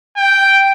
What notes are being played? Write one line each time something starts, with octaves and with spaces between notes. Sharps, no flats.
G5